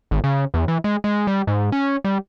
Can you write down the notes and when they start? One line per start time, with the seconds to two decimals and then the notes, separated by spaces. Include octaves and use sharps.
0.11 G#1
0.24 C#3
0.54 E2
0.68 E3
0.84 G#3
1.04 G#3
1.27 G3
1.47 G#2
1.72 C#4
2.04 G3